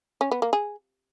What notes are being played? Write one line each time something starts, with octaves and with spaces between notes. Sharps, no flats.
C#4
B3
A#3
G#4